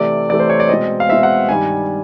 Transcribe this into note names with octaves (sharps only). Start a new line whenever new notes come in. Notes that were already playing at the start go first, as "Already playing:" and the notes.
Already playing: C3 E3 A3 D5
C3 E3 A3 D5
C5
C#5
D5
B2 G#3 C4 D#5
F5
B2 G#3 C4 E5
F#5
G2 D#3 G3 G#5